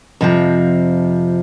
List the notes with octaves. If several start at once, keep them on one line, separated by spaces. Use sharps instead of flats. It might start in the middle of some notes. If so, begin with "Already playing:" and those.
F2 C3 F3